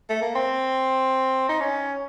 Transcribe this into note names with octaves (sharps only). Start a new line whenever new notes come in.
A3
A#3
C4
D#4
C#4